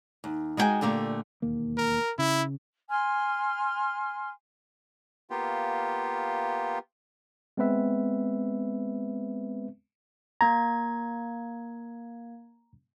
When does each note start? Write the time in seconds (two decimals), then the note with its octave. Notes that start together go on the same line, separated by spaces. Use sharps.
0.24 D#2
0.57 G#3 D#4 E4 F#4 G5 G#5
0.81 A#2 D3 A3 A#3 G4
1.42 E1 D#2 A#3
1.78 A#4
2.18 C#3 E4
2.89 G#5 C6 F6
5.30 A#3 B3 F4 G4
7.57 G#3 B3 C4 B4 E5
10.41 A#3 A#5 G#6